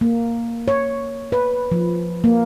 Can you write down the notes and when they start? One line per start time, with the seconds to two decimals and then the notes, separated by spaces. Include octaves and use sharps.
0.01 A#3
0.68 C#5
1.32 B4
1.71 F3
2.24 A#3